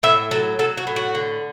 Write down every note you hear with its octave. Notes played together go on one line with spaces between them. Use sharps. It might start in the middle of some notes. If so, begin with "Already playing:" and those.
A2 E5
F#3 A4
F#3 A4
F#4
A2
F#4
D3